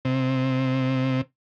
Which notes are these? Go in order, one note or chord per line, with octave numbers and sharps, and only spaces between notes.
C3